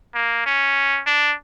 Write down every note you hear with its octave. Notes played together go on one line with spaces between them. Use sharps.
A#3
C#4
D4